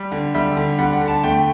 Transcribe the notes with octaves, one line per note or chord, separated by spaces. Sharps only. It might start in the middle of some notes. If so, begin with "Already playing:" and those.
Already playing: G3
D3
G3 E5
D3
G3 F#5
F#5
D3
A5
A3 G5